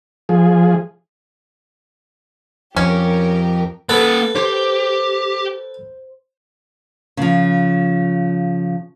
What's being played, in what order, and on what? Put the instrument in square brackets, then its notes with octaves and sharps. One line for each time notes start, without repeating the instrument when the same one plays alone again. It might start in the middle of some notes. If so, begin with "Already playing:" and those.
[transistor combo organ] F3 G#4
[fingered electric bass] F2 [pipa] C#4 [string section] G4 A#4
[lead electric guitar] A#3 F#5 [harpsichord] A4 B4
[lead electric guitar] G4 [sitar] C5
[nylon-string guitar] C#3 F3